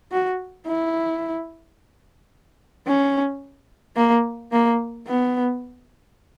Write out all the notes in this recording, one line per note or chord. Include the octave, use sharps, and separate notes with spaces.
F#4
E4
C#4
A#3
A#3
B3